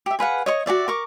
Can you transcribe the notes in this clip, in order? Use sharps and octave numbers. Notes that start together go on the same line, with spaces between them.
G4 E5
G#4 B4 F5 F#5
C#5 D#5 C#6
F#4 G#4 D5 E5
A#4 C#6 D6